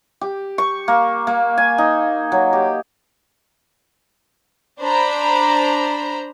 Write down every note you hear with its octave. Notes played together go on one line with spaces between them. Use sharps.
G4
C#6
A#3
A#3
G#5
D#4
F#3
G4
D4 C5 A#5 B5